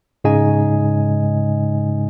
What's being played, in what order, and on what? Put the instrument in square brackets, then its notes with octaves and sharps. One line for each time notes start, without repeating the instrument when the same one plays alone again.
[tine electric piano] G#2 C#3 G#3 D#4 D#5 G#5